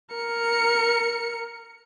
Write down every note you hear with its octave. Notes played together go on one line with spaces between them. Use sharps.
A#4 C#7